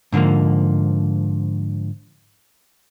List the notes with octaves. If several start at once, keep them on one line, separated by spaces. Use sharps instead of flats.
G#2 D3 D#3 F3 A#3